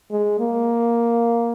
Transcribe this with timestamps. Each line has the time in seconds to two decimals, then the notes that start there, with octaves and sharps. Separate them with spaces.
0.11 G#3
0.40 A#3